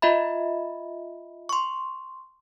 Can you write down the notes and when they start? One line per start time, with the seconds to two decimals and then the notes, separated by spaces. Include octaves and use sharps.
0.02 F4 D#5 E5 B5
1.49 C6 C#6